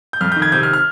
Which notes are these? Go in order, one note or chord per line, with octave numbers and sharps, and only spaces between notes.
G6
F2 F6
G6
D#3
G#6
C3 G6
F6
F6